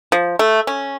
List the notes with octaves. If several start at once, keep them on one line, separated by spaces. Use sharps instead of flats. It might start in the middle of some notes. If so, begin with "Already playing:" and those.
F3
A3
C#4